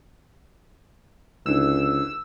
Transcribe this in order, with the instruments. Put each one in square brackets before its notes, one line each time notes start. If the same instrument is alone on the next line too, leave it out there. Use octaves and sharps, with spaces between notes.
[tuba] C#2 [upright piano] G#2 D3 [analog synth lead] E6